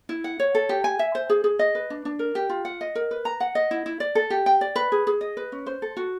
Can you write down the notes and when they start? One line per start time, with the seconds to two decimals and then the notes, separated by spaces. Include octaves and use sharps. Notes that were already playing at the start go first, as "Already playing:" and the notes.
0.09 E4
0.24 F#5
0.40 C#5
0.55 A4
0.69 G4
0.84 G#5
0.99 E5
1.15 C5
1.30 G#4
1.44 G#4
1.59 D#5
1.75 B4
1.90 D4
2.05 D4
2.19 A#4
2.35 G4
2.50 F4
2.65 F#5
2.81 D#5
2.95 A#4
3.11 B4
3.25 A#5
3.40 F#5
3.55 D#5
3.71 E4
3.86 E4
4.00 D5
4.15 A4
4.30 G4
4.46 G5
4.61 D5
4.76 B4
4.92 G#4
5.07 G#4
5.21 D#5
5.37 B4
5.52 C#4
5.67 C5
5.82 A4
5.97 F#4